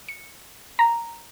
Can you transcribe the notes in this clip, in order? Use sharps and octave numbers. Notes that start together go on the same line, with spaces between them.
C#7
A#5